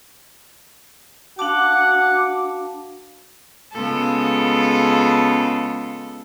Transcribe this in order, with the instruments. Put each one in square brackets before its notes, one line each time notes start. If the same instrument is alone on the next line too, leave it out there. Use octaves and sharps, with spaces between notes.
[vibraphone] D4 F5 A5 [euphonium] F#4 [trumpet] F#5 [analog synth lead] D6
[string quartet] C#3 G#3 B3 F4 A4